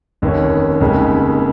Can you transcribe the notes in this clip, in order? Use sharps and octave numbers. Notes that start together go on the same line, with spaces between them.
F1 D#2 D#3 A#3 C#4
F1 D#2 C#3 G#3